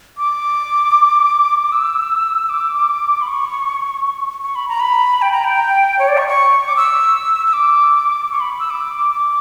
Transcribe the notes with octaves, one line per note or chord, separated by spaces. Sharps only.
D6
E6
D6
B5
C#6
C#6
B5
A#5
B5
G5
A#5
G5
C#5
D5
C#6
C#6
D6
E6
E6
D6
C#6
B5
E6
D6
D6